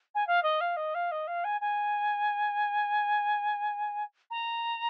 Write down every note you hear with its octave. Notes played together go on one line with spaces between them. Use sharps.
G#5
F5
D#5
F5
D#5
F5
D#5
F5
G#5
G#5
A#5